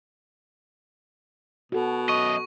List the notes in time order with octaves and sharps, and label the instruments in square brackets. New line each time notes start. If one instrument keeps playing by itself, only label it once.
[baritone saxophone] B2 [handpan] F#4 A4
[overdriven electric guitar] F#2 D#5 [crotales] C#6